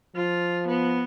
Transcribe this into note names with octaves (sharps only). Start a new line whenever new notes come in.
F3 F4
B3